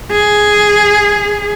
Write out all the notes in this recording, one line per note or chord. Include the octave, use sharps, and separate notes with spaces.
G#4